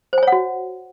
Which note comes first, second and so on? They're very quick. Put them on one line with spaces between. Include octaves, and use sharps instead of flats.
C5 G#5 C#5 F#5 F#4